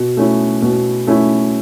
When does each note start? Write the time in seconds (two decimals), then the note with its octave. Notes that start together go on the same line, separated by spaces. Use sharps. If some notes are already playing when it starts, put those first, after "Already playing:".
Already playing: B2
0.17 A3 C#4 E4
0.62 B2
1.07 A3 C#4 E4